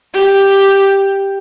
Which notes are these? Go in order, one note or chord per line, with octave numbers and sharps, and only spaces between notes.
G4